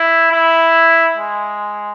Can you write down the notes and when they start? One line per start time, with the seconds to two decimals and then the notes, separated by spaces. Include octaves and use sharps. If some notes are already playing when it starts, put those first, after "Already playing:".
Already playing: E4
0.32 E4
1.17 G#3